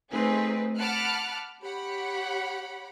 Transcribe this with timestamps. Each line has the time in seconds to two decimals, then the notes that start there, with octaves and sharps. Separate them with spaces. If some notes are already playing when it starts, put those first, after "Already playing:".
0.12 A3 C4 D#4 G#4 B4
0.78 F#5 A5 B5 D6 F6 F#6
1.62 G4 C#5 F#5 B5